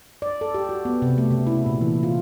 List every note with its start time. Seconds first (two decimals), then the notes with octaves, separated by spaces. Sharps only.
0.22 D5
0.41 A4
0.54 G4
0.69 F#4
0.85 B3
1.02 C3
1.18 A3
1.31 C#3
1.47 E4
1.66 A#2
1.81 E3
2.03 F4